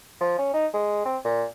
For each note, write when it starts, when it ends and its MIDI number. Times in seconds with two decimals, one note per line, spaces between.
0.21 0.34 53
0.38 0.53 61
0.54 0.67 63
0.73 1.05 56
1.06 1.17 60
1.24 1.45 46